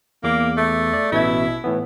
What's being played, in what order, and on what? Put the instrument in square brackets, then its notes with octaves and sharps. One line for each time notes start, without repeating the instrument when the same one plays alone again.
[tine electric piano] E2 D6 [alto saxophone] A#3
[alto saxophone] A3
[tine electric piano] D5
[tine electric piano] A1 B2 G#6 [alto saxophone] E4
[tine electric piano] A2 E3 B3